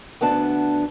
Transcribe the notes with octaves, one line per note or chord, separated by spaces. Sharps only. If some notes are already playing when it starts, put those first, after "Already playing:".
D2 B3 D4 A5